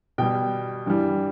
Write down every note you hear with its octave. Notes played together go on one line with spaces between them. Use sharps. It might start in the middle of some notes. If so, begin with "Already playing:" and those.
B2 G3 G5
G2 E3 G3